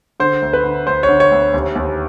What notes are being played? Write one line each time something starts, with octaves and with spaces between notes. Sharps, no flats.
D3 C5
D2
B4
D3
D2 C5
C#5
D3
C#5
D2
D#2
D#2